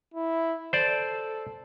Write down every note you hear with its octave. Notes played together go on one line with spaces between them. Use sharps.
E4
A4 C5 D5